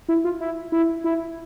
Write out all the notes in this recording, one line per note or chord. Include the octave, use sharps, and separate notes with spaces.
E4
F4
E4
E4
E4